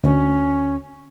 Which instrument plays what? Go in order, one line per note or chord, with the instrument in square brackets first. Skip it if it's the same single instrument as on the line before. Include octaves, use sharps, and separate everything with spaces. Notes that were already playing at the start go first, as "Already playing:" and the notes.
[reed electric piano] D2 [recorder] C#4